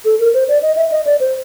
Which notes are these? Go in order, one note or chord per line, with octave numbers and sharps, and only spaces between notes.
A4
A#4
C5
D5
D#5
E5
D#5
D5
C5